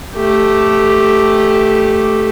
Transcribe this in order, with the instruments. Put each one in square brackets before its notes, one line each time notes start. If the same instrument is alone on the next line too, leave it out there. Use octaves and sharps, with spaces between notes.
[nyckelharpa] A3 G4